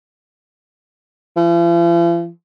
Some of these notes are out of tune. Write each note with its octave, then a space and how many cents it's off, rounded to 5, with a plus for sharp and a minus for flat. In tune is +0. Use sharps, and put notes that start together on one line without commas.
F3 -45